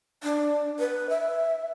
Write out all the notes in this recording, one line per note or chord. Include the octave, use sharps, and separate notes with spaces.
D4
B4
E5